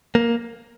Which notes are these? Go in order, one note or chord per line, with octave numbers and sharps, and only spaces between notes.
A#3